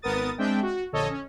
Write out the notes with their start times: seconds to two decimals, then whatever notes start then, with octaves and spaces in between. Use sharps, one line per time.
0.02 G#1 B3 A#4 D#6 A6
0.38 G#3 C4 D4 E5 G5
0.62 F#4
0.92 A#1 D3 A4 C#5 D#5
1.09 C#4